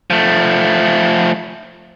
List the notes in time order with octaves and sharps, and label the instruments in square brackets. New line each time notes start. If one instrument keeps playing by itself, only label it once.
[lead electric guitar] F3 A3